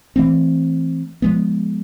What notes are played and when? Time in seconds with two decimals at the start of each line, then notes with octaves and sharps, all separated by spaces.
0.16 E3 A3 C4
1.22 F3 G#3 B3